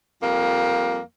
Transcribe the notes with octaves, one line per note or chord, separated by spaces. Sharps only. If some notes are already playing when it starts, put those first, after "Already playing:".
F2 G3 A#3